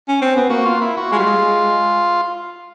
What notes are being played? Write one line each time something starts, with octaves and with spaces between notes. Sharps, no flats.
C#4
C4
B3
A#3 F#4
F4
E4
F#4
G#3 F4
G3
G#3